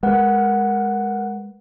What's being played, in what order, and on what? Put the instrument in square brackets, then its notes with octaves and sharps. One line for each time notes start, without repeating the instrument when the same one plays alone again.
[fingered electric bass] G#3 [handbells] A#4 B4 F#5